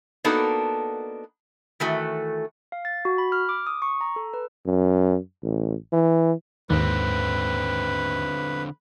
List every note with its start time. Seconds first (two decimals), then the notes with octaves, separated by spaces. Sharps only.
0.24 A#3 B3 D4 D#4 F#4 A4
1.80 D#3 E3 A3 F#4
2.72 F5
2.85 A6
3.05 F#4
3.18 B5
3.32 F6
3.49 D6
3.67 D#6
3.82 C#6
4.01 A#5
4.16 A4
4.34 B4
4.66 F#2
5.43 A1
5.92 E3
6.70 D#2 G#2 D3 C4 B4